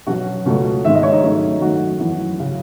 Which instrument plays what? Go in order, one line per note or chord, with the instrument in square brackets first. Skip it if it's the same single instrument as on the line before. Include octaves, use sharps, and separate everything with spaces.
[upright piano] B2 F#3 C#4 F#4
C#2 B2 A3 C#4
G#2 D#3 G#3 B3 E5
D#5
C#5
D#4
G#2 F#3 A3 C#4
F#2 D#3 A3 C#4 F#4
F#2 E3 B3
C#3 F#3